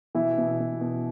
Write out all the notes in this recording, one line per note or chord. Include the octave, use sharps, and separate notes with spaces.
B2 E3 E4
B2
B2
B2